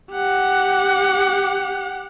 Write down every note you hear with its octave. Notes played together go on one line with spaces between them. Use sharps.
G4 F#5